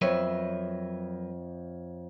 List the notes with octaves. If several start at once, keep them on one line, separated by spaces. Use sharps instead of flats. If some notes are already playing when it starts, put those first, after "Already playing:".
F2 F#3 A#4 B4 C#5 E5